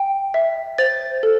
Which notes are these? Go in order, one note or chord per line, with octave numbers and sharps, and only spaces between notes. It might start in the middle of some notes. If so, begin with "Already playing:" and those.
Already playing: G5
E5
C5 A6
A4